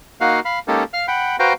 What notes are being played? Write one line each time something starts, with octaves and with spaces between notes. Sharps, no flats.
A#3 D#4 F#4 F5 F#5
F5 B5
G#3 A#3 C#4 D#4 G4 A4
F5 F6
F#5 G5 B5
F#4 B4 C5 F5 G5 A#5